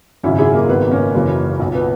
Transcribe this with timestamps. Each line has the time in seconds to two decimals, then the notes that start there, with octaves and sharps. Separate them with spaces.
0.23 G#1 F#2 C#3 C#4 E4
0.38 E4 G#4
0.54 A#3
0.69 G#1 F#2 D#3 B3
0.91 A#3 C#4
1.14 F#1 F#2 C#3 E3
1.60 B1 A#2
1.75 B3